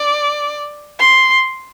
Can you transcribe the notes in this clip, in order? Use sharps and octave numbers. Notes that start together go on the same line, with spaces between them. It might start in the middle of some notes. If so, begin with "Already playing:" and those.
Already playing: D5
C6